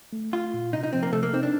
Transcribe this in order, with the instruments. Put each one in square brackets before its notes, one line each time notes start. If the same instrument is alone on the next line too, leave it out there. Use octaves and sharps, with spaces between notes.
[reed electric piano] A3
[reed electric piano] A3 [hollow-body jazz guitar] F4
[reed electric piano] A#2
[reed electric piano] C3 [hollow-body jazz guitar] D#4
[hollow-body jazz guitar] D#4
[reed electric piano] F3 [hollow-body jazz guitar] C4
[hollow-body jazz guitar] A#3
[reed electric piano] C3 [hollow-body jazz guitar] A3
[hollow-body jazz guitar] A#3
[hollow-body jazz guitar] C4 [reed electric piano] D#4
[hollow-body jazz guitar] D4